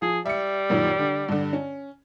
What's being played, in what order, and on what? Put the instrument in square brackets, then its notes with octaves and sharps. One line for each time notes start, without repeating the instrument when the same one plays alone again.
[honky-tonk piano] F3 [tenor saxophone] G#4
[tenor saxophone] G3 [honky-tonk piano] E5 C#7
[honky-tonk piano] F#2 A#2 D#3
D3
G2 D3
C#4